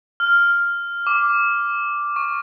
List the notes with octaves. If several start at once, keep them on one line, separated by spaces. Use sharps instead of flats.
F6
D6
C#6